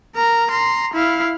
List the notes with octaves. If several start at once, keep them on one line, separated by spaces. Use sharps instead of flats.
A#4 A#5
A#5 C6
E4 F5